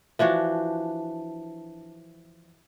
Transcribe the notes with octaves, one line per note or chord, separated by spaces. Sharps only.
E3 F3 D4 F#4